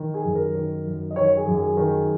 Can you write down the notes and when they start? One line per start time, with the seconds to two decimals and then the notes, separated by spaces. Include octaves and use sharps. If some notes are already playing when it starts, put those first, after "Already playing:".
Already playing: D#3
0.14 G#4
0.24 F#2
0.35 A#4
0.55 D#3
0.86 F#2
1.11 D#5
1.16 D#3 C#5
1.37 G#4
1.46 F#2
1.58 G#4
1.77 D#3